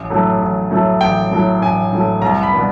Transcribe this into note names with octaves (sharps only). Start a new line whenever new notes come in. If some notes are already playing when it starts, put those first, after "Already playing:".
Already playing: A1
A2 F#3 A3
A1
A2 F#3 A3
A1 G5
A2 F#3 A3
A1 G#5
A2 F#3 A3
C2 A#5
B5
B2 G3 B3